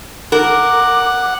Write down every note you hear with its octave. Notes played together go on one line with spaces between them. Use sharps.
A#4 F#5 D6